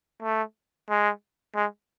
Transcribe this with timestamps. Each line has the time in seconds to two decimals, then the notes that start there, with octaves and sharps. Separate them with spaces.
0.22 A3
0.90 G#3
1.55 G#3